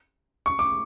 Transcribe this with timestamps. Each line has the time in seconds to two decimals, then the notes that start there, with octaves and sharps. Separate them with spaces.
0.46 C#6
0.59 D6